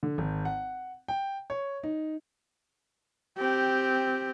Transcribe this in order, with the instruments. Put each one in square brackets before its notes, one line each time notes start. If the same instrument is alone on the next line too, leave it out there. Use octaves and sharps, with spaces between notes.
[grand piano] D3
G#1
F#5
G5
C#5
D#4
[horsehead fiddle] C4 G4